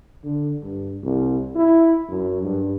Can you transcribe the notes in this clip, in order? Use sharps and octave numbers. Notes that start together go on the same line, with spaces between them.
D3
G2
C2
E4
F#2
G2